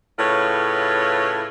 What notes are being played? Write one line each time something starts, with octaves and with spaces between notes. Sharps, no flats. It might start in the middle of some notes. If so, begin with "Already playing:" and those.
A2 C#3 F4 B4 C#5